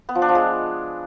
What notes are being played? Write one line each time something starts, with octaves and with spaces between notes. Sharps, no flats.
B3
F3
D4
F3
G#3